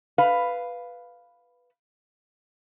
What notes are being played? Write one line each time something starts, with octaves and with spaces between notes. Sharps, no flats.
B4 F5